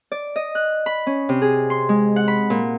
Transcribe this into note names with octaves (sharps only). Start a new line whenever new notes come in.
D5
D#5
F#6
B5
C#4
C3
G#4
C6
G#3
F#5
B5
A#2